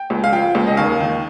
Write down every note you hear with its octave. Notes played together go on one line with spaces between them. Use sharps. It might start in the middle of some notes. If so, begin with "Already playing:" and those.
Already playing: G5
C#2
F5
F3 G5
C#2
D#5
D#2 F5
D#3